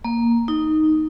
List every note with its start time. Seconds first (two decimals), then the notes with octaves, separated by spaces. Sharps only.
0.05 A#3
0.48 D#4